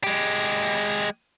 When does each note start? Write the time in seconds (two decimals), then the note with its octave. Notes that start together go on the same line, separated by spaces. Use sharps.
0.04 G#3 G4